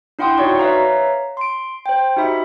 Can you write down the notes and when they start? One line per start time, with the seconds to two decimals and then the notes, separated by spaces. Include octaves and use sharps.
0.19 D4 E4 F#5 G5 C6 D#6
0.38 D#4 F#4 C#5 D5 C#6
0.59 B4 C#5 E5 F5 A#5
1.37 C6 D7
1.86 C5 G5
2.16 D#4 F#4 G4 E5 B5